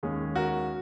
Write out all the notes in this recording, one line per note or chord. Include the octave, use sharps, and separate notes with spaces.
D#2 D#3 G#3 C#4 G#4
F#4 A#4